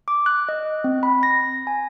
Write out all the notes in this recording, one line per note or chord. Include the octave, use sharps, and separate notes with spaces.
D6
F#6
D#5
C4
B5
A#6
G#5